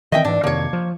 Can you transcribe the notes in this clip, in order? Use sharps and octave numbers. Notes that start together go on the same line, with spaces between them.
D#3 E3 C4 D#5 E5 G5
G#2 E3 D4
F2 C3 D#3 A#3 C#5
F3